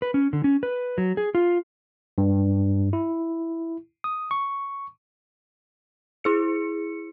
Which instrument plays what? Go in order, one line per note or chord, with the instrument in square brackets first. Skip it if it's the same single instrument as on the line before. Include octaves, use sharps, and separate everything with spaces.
[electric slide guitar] B4
C#4
D3
C#4
B4
F#3
G#4
F4
[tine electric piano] G2
E4
D#6
C#6
[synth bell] E4 G#4 C#7